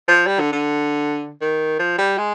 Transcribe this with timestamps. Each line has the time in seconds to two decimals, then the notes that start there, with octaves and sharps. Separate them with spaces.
0.08 F3
0.27 G3
0.39 D3
0.52 D3
1.41 D#3
1.79 F3
1.98 G3
2.18 G#3